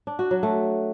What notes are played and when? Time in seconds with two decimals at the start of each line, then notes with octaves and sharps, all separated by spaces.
0.07 D4
0.19 F#4
0.31 F#3
0.43 A3